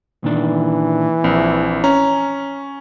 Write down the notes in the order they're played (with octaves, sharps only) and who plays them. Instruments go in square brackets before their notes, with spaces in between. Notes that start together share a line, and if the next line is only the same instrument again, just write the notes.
[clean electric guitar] A#2 D#3 D4 [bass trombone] E3
[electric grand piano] A#1 [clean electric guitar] C4
[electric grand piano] C#4 [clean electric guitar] A#5